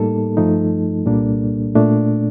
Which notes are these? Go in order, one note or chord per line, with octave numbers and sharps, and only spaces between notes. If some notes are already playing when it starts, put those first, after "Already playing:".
Already playing: A2 G3 A#3 D#4 A4
G2 F3 A3 D#4
C2 A#2 G3 A#3 D4
A#2 A3 D4